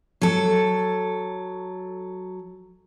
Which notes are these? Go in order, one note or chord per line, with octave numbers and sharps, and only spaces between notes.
F#3 A4